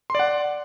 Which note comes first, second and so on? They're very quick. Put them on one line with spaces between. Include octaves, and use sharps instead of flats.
C6 D5 F#5